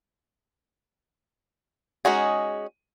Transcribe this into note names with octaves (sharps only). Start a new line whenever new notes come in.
G#3 C#4 D#4 F#4 G#4